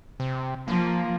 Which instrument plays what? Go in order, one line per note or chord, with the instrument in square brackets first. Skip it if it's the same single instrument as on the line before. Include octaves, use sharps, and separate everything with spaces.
[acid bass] C3
[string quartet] F3 [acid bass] A#3